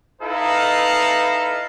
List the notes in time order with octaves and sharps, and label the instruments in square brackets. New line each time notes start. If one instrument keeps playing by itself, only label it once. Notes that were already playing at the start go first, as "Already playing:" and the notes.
[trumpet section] D#4 E4 A4 B4 D#5 F5